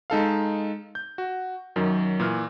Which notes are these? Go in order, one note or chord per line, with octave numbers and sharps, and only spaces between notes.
G#3 D#4 A4 F5
G6
F#4
F#2 D#3 F#3
A#2 E3 F6